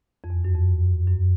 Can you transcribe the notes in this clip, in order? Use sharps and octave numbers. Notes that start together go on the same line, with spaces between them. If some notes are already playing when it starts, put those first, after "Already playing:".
F2
E2
F#2
F2
F#2